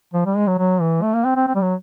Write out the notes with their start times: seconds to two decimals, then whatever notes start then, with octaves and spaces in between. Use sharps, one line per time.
0.14 F3
0.25 G3
0.37 G#3
0.47 F#3
0.58 F#3
0.81 E3
1.02 A3
1.14 A#3
1.25 C4
1.36 C4
1.47 C4
1.55 G3
1.61 F#3